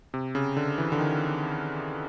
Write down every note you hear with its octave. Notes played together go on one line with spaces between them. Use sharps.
C3
C#3
D3
E3
D3
D#3